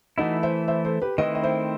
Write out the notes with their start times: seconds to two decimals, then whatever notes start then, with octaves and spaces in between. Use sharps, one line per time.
0.18 E3 A3 D#4 E4 F#4
0.43 C5 E5
0.68 C5 E5
0.85 A4 C5
1.02 G4 B4
1.18 D#3 A3 C4 E4 B4 D#5
1.35 D#5
1.43 C5 E5